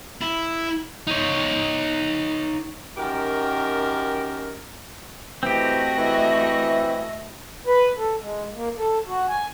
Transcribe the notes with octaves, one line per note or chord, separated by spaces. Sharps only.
E4
D#4 C#5
F#2 D#3 G4 A#4
E3 A3 C4 F#4 G4 D#5
E3 E5
B4
A4
G#3
A#3
A4
F#4
G#5